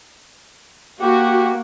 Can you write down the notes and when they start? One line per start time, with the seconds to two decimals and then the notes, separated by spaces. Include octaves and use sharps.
1.01 A#3 F#4 G4